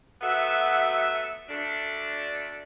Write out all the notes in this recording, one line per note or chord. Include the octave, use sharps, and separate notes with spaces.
F#3 A3 B3 F#4 E5
D2 A3 D4